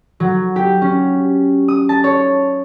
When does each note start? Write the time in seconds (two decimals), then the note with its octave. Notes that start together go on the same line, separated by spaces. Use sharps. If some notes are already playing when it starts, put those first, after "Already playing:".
0.20 F#3
0.56 G4
0.82 C#4
1.68 D#6
1.89 A5
2.04 C#5